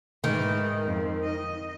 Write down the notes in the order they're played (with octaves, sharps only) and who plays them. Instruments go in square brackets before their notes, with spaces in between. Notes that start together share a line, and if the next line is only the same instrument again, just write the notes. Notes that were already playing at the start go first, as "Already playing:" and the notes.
[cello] G#2 E3 [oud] D#3
[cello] F2
D#5